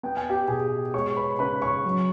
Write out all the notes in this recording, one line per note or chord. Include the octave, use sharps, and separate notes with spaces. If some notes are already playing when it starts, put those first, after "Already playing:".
B3 G5
G#5
G4 G5
B2 G#4 G#5
G#3 C#5 C#6
B4 B5
C#3 B4 B5
C#5 C#6
F#3